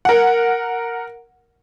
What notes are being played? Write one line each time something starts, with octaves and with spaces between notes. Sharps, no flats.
A#4 F#5